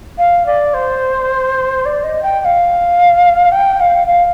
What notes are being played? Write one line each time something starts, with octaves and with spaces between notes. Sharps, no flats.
F5
D5
C5
D5
D#5
G5
G5
F5
G5
F5
F5